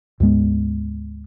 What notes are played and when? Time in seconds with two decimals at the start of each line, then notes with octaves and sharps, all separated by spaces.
0.20 D2 G#2 G#3 B3